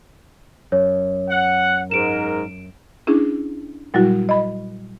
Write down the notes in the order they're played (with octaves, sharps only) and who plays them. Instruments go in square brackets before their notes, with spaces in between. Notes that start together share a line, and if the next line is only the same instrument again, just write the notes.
[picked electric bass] F#2 [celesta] C#5
[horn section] F#5
[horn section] G#2 A#4 [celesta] D7 E7
[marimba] C#4 D4 E4 G#4
A#2 F#3 G3 E4 F#4
D#5 B5